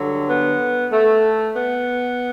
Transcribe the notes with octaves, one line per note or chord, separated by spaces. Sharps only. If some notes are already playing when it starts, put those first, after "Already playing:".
Already playing: G2 D3 F#3
B3
A3
B3